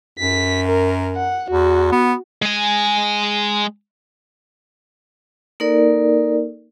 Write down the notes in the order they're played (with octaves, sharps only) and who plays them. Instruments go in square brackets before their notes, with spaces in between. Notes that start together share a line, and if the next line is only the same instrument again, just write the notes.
[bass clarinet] F#2 [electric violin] B6
[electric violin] A#4
F#5
[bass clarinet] E2 [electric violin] F#4
[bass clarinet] B3
[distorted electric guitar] G#3 G#5
[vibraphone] A#3 D#4 A4 A#4 D5